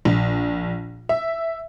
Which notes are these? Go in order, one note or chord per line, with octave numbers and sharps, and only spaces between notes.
A#1
E5